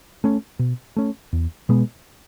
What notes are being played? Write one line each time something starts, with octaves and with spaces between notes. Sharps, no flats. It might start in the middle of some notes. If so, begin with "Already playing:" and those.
A3 C#4
B2
A3 C#4
E2
B2 G#3 B3